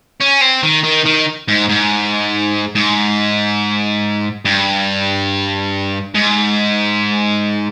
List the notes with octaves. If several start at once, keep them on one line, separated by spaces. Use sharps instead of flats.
C#4
C4
D#3
D#3
D#3
G#2
G#2
G#2
G2
G#2